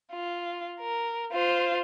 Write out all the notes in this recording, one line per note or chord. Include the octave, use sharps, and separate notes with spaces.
F4
A#4
F4 C5